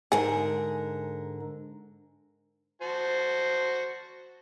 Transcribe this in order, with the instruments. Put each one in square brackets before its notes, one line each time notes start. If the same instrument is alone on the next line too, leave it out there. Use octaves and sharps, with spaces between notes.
[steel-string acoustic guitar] G#2 D3 A#4 [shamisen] G#4
[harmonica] F#4 C5 A5